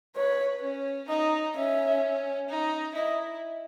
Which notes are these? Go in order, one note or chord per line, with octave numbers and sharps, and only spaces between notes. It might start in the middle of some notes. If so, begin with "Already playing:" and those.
B4 C#5
C#4
D#4 D#5
C#4 E5
D#4
E4 D#5